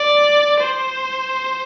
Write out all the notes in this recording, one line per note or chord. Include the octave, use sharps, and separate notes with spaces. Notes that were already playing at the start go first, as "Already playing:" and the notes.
Already playing: D5
C5